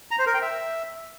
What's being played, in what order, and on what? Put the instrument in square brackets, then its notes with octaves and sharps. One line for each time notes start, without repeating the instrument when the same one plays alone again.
[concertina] A#5
C5
A#4
G5
E5